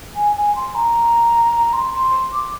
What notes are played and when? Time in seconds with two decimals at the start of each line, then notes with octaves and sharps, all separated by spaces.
0.16 G#5
0.36 G#5
0.56 C6
0.75 A#5
1.73 C6
1.94 C6
2.33 D6